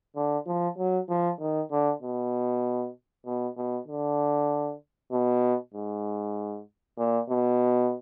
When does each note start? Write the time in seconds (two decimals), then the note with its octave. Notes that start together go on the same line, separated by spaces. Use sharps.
0.16 D3
0.47 F3
0.78 F#3
1.09 F3
1.40 D#3
1.71 D3
2.02 B2
3.26 B2
3.57 B2
3.88 D3
5.12 B2
5.74 G#2
6.98 A#2
7.29 B2